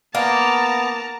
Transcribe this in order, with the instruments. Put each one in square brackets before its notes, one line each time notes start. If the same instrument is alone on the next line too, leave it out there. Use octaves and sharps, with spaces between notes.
[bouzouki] A#3 [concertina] B3 [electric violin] A5 A#5